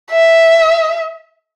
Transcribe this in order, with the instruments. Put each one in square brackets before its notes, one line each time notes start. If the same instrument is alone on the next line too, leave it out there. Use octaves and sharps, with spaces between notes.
[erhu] E5